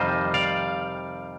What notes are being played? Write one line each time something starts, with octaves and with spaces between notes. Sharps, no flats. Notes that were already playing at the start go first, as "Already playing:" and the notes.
Already playing: F2 C3 D#3 G3 C5 D#5
D5 F5